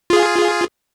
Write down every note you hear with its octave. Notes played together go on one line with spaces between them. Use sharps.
F4 G#4